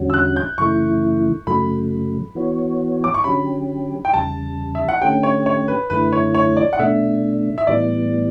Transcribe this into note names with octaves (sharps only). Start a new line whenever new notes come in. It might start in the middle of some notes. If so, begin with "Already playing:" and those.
Already playing: E2 D3 G3 C#4 F#4
E6
F#6
G6
F#2 C#3 E3 A3 E4 C#6
F#2 C#3 F#3 A3 B5
E3 B3 F#4 C#5
D6
C#6
D3 F#3 C#4 G4 B5
G5
E2 C#3 G3 A5
E5
F#5
D3 A3 C#4 G4 G5
C#5
C#5
B4
F#2 D3 A3 E4 B4
C#5
C#5
D5
F#5
B2 A3 D4 E5
E5
A2 E3 G3 B3 D5